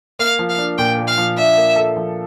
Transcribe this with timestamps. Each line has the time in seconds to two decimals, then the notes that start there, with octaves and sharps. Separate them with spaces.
0.19 A#3 F5
0.39 F3
0.49 F5
0.58 D4
0.78 A#2 G5
0.98 A#3
1.07 F5
1.18 F3
1.37 D4 E5
1.57 A#3
1.76 A4
1.96 F3